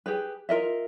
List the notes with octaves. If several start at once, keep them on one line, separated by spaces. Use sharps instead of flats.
G4 G#4 B4
F4 A#4 D#5 E5